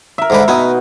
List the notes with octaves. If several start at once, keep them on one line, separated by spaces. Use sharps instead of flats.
A#4 E5
G#2 D3 B4
B2 B3 D#4 G#5